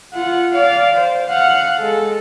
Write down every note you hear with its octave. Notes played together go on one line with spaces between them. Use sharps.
F4 F#5
D5 F5
C5
F5 F#5
G#3 A4